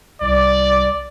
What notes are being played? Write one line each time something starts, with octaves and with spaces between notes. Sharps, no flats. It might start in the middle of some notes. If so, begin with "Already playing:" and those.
C2 D5